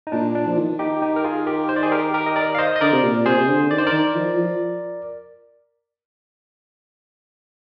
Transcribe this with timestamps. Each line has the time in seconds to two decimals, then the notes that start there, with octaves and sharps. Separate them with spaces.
0.07 D#4
0.12 A#2 D4
0.35 D4
0.47 F3
0.57 D#3
0.79 D#4 G4
1.02 D#4 G4
1.16 A#4
1.24 F4 G#4
1.47 G4 A#4
1.69 C5
1.76 D5
1.83 G#4 C5
1.91 G4 A#4
2.14 G4 A#4
2.26 D#5
2.36 A#4 D5
2.55 F5
2.58 C5 D#5
2.76 D#5
2.81 D3 A#4 D5
2.93 C3
3.03 A#2
3.26 C3 G#4 C5
3.39 C3
3.48 D3
3.70 D#3 D5
3.78 C5
3.87 A#4 D5
3.93 D#3
4.15 F3
4.37 F3